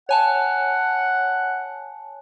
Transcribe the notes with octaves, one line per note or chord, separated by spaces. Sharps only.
C#5 F#5 G#5 A5